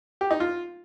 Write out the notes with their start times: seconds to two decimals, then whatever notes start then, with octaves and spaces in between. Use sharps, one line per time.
0.21 G4
0.31 D#4
0.40 F4